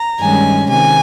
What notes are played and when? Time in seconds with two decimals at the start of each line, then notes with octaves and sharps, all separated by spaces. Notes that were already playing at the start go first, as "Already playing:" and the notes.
Already playing: A#5
0.19 G2 D#3 G#3 C#4 G#5
0.69 C3 D#3 G#5